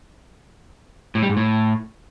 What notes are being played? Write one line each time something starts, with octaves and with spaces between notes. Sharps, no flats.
A2
G3
G#2
A2